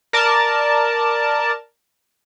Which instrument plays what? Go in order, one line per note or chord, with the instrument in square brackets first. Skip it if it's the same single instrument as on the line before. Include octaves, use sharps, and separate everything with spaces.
[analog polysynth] A#4 D5 A5